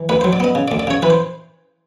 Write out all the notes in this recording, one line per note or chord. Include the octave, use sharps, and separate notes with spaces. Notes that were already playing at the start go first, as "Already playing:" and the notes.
Already playing: E3
D2 B4
F#3 C5
D5
B3 D#5
C#3
D5
D2
D5
C#3 C#5
E3 B4
C5